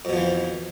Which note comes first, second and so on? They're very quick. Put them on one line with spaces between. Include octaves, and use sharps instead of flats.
F2 B2 F3 E3